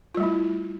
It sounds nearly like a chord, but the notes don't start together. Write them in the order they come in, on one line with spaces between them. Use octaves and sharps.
F4 G3 A3 E4